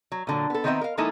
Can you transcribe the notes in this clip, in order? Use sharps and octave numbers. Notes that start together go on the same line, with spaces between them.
F#3
A#2 D3 F#3
B3 A4
D#3 B3 C4 D#4 D#5 E5
A#4 F5
F3 G#3 A#3 D#4 E4 A4